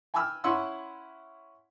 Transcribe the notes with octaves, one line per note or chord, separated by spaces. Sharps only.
G5 G#5 B5 D6 E6 F6
C#4 E4 F#5 C6 E6